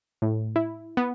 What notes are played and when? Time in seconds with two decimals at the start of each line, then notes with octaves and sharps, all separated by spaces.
0.22 A2
0.56 E4
0.97 B3